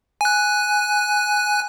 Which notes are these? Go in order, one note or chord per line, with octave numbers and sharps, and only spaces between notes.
G#5 F#6